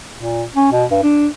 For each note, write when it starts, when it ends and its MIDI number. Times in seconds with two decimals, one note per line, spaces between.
0.17 0.44 46
0.56 0.67 61
0.72 0.85 47
0.91 0.99 43
1.03 1.27 62